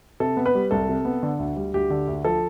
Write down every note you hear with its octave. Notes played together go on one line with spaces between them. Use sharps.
C3 A4
B3
B4
G3
C2 A4
C3
B3
D3
D2
G3
D2 G4
D3
D2
F3 A4